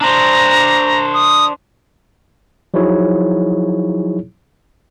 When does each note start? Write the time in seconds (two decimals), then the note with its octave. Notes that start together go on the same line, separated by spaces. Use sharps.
0.01 D4 C5 A#5
1.14 D#6
2.74 F3 F#3 D#4 E4 G#4 C#5